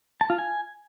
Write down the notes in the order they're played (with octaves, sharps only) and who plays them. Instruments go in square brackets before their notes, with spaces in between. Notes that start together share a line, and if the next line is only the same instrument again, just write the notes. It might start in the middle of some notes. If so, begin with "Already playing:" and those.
[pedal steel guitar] A5
F4
G#5